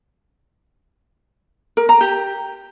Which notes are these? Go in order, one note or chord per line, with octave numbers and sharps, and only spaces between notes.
A#4
A#5
G4